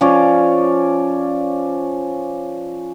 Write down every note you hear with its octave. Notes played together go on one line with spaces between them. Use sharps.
F3 C#4 C#5 D5